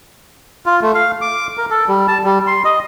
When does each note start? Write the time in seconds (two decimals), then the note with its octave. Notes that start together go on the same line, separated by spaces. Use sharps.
0.66 F4
0.82 A3
0.95 F5
1.21 D6
1.58 A#4
1.70 A4
1.88 G3
2.08 A5
2.24 G3
2.47 C6
2.65 D#5